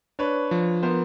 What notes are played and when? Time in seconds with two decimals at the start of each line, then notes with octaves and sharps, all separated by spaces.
0.19 D4 B4 C#5
0.51 F3
0.83 B3 A#4 C5